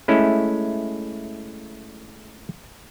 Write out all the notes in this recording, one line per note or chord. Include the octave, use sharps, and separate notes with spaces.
G#3 A3 C#4 E4